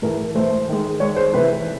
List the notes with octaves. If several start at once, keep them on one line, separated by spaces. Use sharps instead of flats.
A2 E3 A3 A#4
A2 E3 A3 C5
D#3 G#3
D#3 G#3 C#5
C5
C3 E3 A3 B4